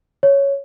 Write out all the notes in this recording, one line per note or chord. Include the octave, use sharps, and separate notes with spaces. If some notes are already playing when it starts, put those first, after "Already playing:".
C#5